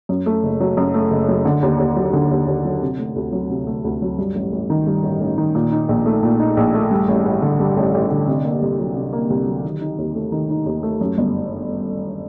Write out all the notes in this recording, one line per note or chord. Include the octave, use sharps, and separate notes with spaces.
F#2
A3
F#1
F#3
F#2
A3
F#1
F#3
D3
D#2
D#2
F#3
D3
D#2
D#2
F#3
C3
A3
D2
F#3
C3
A3
D2
F#3
G2
A1
A1
D#3
G2
A1
A1
D#3
A#2
D#4
A#1
A3
A#2
D#4
A#1
A3
G2
A1
A1
D3
G2
A1
A1
D3
C3
A#3
C2
F#3
C3
A#3
C2
F#3
D#3
D#4
D#2
A3
D#3
D#4
D#2
A3
F#2
G1